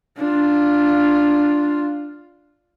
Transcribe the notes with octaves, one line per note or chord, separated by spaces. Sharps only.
D4 F4